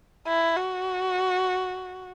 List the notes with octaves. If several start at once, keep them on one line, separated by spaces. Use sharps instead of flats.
E4
F#4